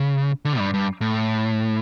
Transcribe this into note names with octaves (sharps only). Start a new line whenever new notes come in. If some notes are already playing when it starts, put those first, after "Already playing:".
Already playing: C#3
D3
G2
G2
A2